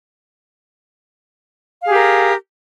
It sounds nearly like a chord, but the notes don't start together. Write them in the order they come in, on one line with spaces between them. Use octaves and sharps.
F5 G#4 G4 A#4